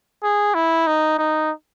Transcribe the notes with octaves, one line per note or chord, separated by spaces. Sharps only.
G#4
E4
D#4
D#4